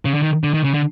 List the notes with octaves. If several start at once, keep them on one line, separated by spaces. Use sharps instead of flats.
C#3
D3
D#3
D3
D#3
C#3
D3